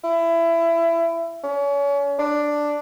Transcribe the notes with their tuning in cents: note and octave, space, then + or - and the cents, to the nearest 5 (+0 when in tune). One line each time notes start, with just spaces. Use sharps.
E4 +20
C#4 +35
D4 +5